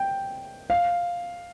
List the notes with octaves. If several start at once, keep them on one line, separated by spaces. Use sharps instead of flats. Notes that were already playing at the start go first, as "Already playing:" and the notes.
Already playing: G5
F5